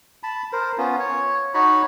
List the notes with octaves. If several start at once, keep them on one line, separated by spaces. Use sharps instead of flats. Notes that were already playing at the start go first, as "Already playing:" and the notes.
A5 B5
A#4 C5
B3 C#4 F4
C#5
D#4 F#4 C#5 B5